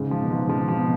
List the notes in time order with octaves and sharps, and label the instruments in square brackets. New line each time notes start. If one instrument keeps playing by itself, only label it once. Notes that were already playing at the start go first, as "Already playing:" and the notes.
Already playing: [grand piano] G#2 [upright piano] C#3
[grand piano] F3
[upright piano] B2
[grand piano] G#2
[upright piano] C#3 [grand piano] F3
[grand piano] F3
[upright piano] B2